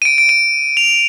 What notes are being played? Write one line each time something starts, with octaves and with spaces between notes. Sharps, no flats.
D#7
D7
D7
D#7
F7